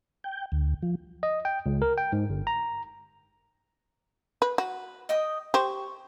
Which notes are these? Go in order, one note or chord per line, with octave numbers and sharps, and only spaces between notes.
G5
D2
F3
D#5
G5
C#2
A#4
G5
G#2
G1
A#5
B4
F#4 B4
D#5 G5 D#6
G4 C5 C#6